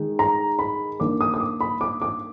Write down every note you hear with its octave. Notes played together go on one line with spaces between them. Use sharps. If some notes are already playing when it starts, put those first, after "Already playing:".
Already playing: D#3 G#3 D#4
A#5
B5
D#3 A#3 D4 D6
D#6
D#6
D6
B5
D6
D6